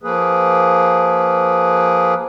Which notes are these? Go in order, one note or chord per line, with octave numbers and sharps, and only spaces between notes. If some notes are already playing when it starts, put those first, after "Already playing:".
F3 A#3 G#4 B4